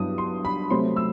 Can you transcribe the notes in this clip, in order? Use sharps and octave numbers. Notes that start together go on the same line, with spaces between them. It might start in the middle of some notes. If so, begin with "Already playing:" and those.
Already playing: G2 F#3 B3 E4 D#6
C6
B5
C3 F#3 A3 C4 C6
E6